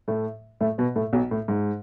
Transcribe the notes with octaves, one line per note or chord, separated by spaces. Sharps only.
A2 A3
A2 A3
B2 B3
A2 A3
B1 B2
A2
G#2